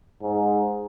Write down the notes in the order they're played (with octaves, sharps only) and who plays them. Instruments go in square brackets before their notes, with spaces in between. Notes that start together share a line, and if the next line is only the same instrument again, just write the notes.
[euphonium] G#2